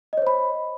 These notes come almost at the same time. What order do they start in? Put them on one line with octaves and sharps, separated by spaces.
D#5 C#5 C5 B5